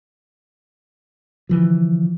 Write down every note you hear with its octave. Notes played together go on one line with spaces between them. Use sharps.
D3 E3 F3